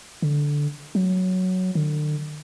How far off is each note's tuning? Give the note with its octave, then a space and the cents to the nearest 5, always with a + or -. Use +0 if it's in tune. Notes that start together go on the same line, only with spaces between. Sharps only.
D3 -5
F#3 +0
D3 +40